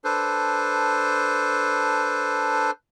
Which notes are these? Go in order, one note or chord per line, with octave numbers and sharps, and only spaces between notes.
D4 A4 B4 C5